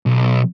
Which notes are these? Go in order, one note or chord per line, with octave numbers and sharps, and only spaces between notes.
B1